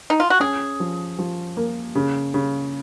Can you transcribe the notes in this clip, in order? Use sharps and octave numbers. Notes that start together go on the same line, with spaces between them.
D#4
F4
F#4
C#4 G#4
F3
F3
A#3
C#3
C#3